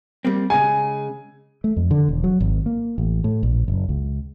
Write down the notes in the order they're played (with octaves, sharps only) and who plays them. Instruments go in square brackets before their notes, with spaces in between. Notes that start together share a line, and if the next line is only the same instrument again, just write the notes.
[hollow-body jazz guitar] G3 A#3 C4
[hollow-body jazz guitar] C#3 G#3 G#4 [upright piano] G#5
[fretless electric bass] A3
F2
D3
E1
F#3
G#1
A#3
A1
A2
A#1
F#1
C#2